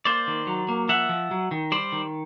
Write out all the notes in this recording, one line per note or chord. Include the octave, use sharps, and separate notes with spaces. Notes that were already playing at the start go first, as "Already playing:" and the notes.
A#3 C5 D5
D#3
F#3
A#3
F3 E5 F#5
F3
F#3
D#3
G3 C5 D5
D#3